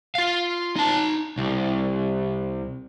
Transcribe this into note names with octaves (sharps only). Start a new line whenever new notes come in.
F4 F5
D#4 A5
C2